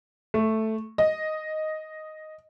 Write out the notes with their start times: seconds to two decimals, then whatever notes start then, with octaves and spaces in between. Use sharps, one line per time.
0.34 A3
0.98 D#5